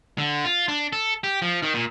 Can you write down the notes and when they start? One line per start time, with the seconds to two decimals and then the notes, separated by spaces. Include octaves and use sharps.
0.18 D3
0.45 F4
0.68 D4
0.93 A4
1.24 G4
1.42 F3
1.63 D#3
1.74 A#2